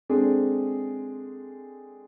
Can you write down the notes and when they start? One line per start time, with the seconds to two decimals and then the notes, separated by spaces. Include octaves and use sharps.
0.09 G#3 C4 D4 G#4 A4